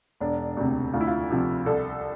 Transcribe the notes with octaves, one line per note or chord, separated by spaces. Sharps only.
E1 D4
D2 C3
D2 F4
E4
F4
C3 F3
C2 A4